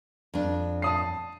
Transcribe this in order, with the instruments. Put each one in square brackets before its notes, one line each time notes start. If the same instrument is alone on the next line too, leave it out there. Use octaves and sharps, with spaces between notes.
[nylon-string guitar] F2 D4
[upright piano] A5 D#6 C7